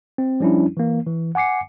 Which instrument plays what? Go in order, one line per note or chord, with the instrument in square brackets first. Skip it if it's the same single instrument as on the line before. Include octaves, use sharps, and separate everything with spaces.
[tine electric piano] C4
F3 G3 C#4 D4 E4
E3 A#3
E3
F#5 G#5 D6 C7 C#7